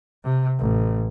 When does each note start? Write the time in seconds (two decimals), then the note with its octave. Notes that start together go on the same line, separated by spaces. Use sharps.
0.24 C3
0.59 A1